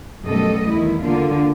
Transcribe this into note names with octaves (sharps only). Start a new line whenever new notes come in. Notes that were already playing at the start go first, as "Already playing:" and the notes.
F#2 B2 G3 A3 A4 D#5
E2 D#3 E4
D3 A#3 F4